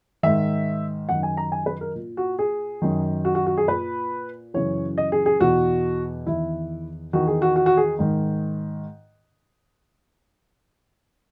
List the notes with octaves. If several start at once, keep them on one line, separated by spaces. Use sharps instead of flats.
G#2 D#3 E5
F#2 D#3 F#5
G#5
A#5
G#5
B4
A#4
A#2
F#4
G#4
F#2 D#3
F#4
F#4
F#4
G#4
A#2 B4
F#2 C#3 E3 C#5
D#5
G#4
G#4
E2 B2 F#4
E2 D#3 E4
E2 D#3 F#4
G#4
F#4
F#4
F#4
G#4
G#2 D#3